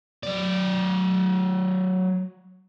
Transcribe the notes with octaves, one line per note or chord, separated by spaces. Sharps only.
F#3 D5